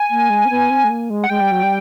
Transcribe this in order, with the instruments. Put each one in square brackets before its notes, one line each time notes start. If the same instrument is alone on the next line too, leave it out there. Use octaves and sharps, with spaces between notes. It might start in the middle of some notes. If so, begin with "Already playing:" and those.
Already playing: [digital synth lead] G#5
[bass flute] A#3
G#3
C4
B3
C4
A3
A#3
G#3
[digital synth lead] F#5
[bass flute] G#3 [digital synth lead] G5
[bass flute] G3
F#3
G3